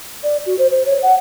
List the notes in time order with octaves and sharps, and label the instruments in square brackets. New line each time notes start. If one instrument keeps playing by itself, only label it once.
[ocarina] D5
F#4
C5
C5
C#5
F#5